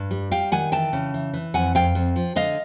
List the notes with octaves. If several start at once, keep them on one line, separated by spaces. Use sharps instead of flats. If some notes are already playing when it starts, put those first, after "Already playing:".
Already playing: G2
G3
G3 F5 G5
D#3 F#5 G#5
E3 G5 A5
C#3
E3
E3
F2 F#5 G#5
F2 F5 G5
F2
F3
D3 D#5 F5